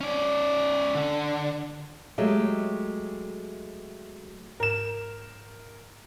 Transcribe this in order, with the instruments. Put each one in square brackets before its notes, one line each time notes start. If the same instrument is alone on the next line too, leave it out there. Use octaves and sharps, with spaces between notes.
[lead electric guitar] C#4 D5
D3
[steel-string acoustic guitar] F#3 G#3 A3 G4
[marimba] G#2 [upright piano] A#4 E7